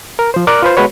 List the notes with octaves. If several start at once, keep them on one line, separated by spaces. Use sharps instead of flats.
A#4
F3 C5
A#4 D5 D6 F6 F#6
F4 B4 C5
G#3 B3 F#4 B4 C#5